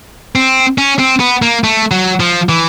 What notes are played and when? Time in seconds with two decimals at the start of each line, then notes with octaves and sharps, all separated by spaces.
0.35 C4
0.78 C#4
0.99 C4
1.20 B3
1.42 A#3
1.64 A3
1.91 F#3
2.20 F3
2.49 E3